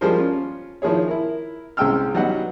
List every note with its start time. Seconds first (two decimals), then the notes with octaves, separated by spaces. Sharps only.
0.01 F3 G3 G#3 G#4 A#4 C5
0.19 C#4 F4
0.82 D#3 F3 E4 G#4 C#5
1.08 E4 A#4
1.77 C2 G#3 C#4 G5 E6 F6
2.15 F#3 G3 B3 D#4 F#5